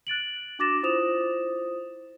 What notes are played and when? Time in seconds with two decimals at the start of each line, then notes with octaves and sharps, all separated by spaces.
0.07 F#6 A6 D7 F#7
0.59 D4 F#4 D6 A6 A#6 E7
0.83 E4 F4 C5 D#6 E7 F7